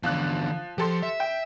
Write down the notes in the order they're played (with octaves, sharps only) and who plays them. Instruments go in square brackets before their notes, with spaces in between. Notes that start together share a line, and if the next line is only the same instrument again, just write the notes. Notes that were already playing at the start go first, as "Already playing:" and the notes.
[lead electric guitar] E2 D3 [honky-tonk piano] F3 F#6
[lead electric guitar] F3 [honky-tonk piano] G4 A4 C6
[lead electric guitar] E5
[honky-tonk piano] G5